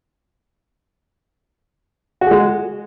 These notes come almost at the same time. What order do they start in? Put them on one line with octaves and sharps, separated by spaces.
F#4 G#4 G#3